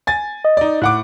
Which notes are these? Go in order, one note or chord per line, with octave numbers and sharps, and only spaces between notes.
G#5 A6
D#5
D#4 D5
A2 F#5 D6 F#6